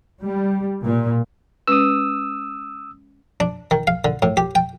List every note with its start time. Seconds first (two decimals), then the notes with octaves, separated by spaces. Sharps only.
0.23 G3
0.84 A#2
1.68 G#3 C#4 B4 D#6 E6
3.40 D4
3.71 D#3
3.87 F5
4.05 D3
4.22 A2
4.37 G4
4.55 G5